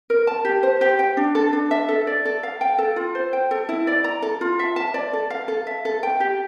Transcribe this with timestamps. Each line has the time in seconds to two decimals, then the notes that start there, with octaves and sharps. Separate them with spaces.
0.10 A#4
0.27 A5
0.45 G4
0.63 C5
0.81 G4
0.99 G5
1.17 D4
1.35 A4
1.53 D4
1.71 E5
1.89 A4
2.07 D5
2.25 A4
2.43 F5
2.61 G5
2.78 A4
2.96 F4
3.15 C5
3.33 G5
3.51 A4
3.69 E4
3.87 D5
4.04 A#5
4.22 A4
4.41 F4
4.59 E5
4.76 A5
4.94 D5
5.13 A4
5.30 F5
5.48 A4
5.67 E5
5.85 A4
6.03 G5
6.20 G4